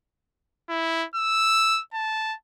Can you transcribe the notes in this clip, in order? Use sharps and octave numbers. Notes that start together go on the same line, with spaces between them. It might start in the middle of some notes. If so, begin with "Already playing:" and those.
E4
E6
A5